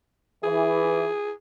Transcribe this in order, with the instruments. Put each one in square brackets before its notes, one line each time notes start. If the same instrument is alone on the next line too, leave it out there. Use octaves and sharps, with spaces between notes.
[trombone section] E3 [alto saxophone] G#4